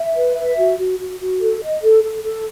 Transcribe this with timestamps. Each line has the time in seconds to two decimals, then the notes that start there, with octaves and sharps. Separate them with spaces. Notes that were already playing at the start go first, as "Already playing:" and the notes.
Already playing: E5
0.15 B4
0.36 E5
0.57 F#4
0.78 F#4
0.99 F#4
1.20 F#4
1.41 A4
1.62 D#5
1.83 A4
2.04 A4
2.24 A4